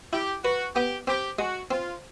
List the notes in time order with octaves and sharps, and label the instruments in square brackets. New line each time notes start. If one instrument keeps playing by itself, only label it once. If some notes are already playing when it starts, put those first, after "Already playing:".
[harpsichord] E4 [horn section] G4
[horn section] F#4 [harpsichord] B4
[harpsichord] B3 [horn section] G4
[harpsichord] C4 [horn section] G4
[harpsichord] G#3 [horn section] F#4
[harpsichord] C4 [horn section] F4